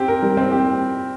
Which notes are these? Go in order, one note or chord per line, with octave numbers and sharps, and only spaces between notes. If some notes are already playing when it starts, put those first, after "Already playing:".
Already playing: C4 G4
A#4
G3
C4
G4